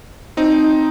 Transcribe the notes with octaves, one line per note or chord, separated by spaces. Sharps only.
C4 D#4